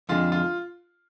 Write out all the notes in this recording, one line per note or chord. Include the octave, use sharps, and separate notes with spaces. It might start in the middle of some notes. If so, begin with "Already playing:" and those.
F2 D3 G#3 F4
F4